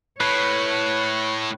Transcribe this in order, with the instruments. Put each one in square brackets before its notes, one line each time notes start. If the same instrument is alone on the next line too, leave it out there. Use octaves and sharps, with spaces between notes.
[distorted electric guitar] A2 [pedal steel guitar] B4 [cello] C#5